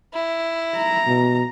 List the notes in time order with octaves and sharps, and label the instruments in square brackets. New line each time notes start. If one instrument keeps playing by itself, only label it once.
[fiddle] E4
[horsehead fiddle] A#5
[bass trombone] B2